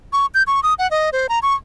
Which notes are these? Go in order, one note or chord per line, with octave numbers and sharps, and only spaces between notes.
C#6
G6
C#6
D#6
F#5
D#5
C5
A#5
C#6